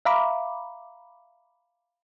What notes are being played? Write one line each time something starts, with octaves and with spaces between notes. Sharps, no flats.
E5 F5 A#5 B5 D6